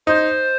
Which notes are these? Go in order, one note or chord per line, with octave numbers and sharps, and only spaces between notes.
D#4 C5